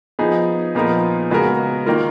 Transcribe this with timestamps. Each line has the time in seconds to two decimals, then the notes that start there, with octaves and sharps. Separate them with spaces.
0.19 F3 B3 D#4 G#4
0.75 A#2 F3 B3 D#4 A#4
1.30 C#3 G#3 B3 F#4 A#4
1.86 D#3 A#3 F4 A#4